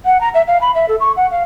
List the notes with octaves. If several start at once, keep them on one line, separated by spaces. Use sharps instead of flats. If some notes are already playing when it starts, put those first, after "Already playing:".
F#5
A#5
E5
F5
B5
E5
A4
C#6
F#5
F5